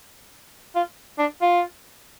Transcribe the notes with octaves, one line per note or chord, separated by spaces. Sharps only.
F4
D4
F4